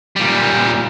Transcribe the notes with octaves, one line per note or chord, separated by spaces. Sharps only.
A#2 G3